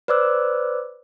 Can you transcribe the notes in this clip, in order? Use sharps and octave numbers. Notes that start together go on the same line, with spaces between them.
B4 C5 D5 D6 E6 F#6